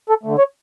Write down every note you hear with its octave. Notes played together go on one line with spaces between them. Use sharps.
A4
D3 A3
C#5